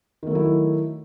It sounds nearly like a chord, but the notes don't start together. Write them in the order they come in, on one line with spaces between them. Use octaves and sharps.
D#3 A3 F#3 E4